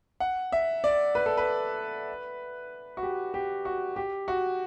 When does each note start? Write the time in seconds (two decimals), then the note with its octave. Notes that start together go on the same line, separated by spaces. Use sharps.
0.20 F#5
0.52 E5
0.84 D5
1.15 B4
1.26 A4
1.37 B4
2.97 F#4
3.03 G4
3.34 G4
3.65 F#4
3.96 G4
4.28 F#4